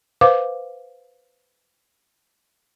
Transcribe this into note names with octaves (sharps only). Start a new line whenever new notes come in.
B4 C5 F5 D6